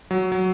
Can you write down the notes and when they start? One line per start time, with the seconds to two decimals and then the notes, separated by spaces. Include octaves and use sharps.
0.11 F#3
0.32 F#3